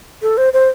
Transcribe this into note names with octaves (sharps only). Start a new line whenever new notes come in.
A4
C5
C5